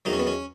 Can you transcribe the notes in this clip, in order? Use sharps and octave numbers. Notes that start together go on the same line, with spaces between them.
E2 D#3 F#3 D#4
C#4
B3
C#4